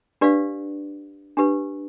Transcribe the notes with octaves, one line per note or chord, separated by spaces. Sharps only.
D4 G4 B4 D5 F5
D4 G4 B4